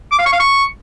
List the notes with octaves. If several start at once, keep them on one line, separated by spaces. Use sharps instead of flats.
D6
F5
C#6
F5
C#6